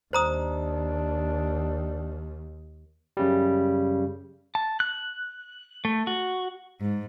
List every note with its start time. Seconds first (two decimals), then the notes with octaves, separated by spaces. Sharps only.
0.13 D#2 D4 C5 A#5 D#6
3.17 F#2 C#3 G3
4.55 A5
4.80 F#6
5.85 A3
6.07 F#4
6.81 G#2